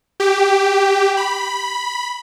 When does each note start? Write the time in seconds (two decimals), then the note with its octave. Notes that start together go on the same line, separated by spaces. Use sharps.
0.20 G4
1.17 B5